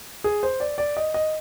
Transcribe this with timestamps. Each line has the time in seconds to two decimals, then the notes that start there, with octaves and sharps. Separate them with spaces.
0.24 G#4
0.43 C5
0.60 D5
0.78 D5
0.97 D#5
1.14 D#5